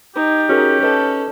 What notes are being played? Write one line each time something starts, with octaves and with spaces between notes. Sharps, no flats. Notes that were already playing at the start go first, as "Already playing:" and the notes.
D#4 G4
C#4 F#4 G#4 A#4
A4 B4 D#5